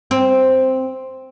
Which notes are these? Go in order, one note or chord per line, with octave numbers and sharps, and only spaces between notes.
C4